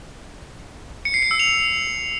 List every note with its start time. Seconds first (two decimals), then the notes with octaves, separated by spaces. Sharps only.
1.05 C#7
1.14 C7
1.22 C#7
1.31 E6
1.40 F7